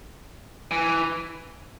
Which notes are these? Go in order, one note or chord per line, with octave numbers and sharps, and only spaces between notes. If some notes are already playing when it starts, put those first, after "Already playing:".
E3